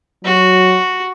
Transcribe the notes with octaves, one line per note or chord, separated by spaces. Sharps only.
F#3 F#4